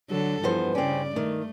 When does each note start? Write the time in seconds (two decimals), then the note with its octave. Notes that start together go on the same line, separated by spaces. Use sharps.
0.10 D3 F#3 A4
0.44 E2 G2 F3 B3 C5
0.75 C#3 C4 C#4 D5
1.16 D#3 A3